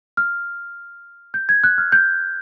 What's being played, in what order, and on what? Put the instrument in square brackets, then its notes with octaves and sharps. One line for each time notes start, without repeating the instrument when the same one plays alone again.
[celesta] F6
G6
G#6
F#6
F6
G6